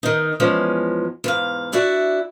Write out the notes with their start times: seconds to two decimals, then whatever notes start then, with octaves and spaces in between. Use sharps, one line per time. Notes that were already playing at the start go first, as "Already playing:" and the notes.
0.03 D#3 D#4
0.40 E2 F3 G#3 C#4
1.24 E2 G#2 F5
1.72 D4 E4 F#4 D5 E5